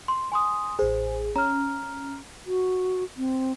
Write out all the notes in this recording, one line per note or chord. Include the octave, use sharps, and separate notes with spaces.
C6
G#5 C6 D#6
A1 G#4 C5
C#4 A#5 F6
F#4
C4